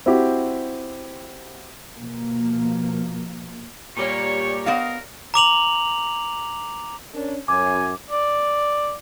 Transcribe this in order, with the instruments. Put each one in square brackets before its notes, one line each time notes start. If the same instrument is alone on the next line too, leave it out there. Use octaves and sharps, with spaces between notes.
[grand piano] C4 E4 F#4 G4
[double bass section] B2 F3 A#3
[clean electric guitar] A#2 G3 A#3 [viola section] G4 C#5 D5 [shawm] C#6
[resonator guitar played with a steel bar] B3 D#5 F5 [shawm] A#4
[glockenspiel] A#5 D6 F7 F#7
[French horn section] C#4 D4 A#4
[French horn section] F#2 [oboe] G#5 [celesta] D6
[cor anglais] D5